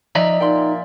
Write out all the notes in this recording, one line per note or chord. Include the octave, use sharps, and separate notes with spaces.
F3 D#4 D5 E5 A#5
A#2 D#4 G5 C6